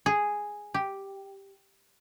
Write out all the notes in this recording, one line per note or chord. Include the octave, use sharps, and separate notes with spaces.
G#4
G4